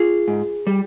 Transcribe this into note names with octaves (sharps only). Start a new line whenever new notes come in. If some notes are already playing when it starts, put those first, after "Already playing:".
Already playing: F4 G#4
G#2
G3